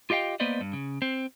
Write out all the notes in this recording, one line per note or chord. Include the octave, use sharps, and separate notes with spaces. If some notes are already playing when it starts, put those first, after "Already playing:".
F4 G4 D#5 F5 G5
A#3 B3 B4 C5 D5 D#5
G2
C#3
C4